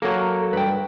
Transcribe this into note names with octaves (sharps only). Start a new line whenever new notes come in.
F#3 A#3 A4
G2 B4 G5